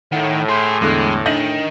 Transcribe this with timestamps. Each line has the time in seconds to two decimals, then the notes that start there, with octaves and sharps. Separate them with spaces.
0.12 A2 D#3 F#5
0.49 G#4 G5 C6
0.82 E2 D3 G#3 F#6
1.26 D#3 D4 D#5 G6 A#6 B6 F#7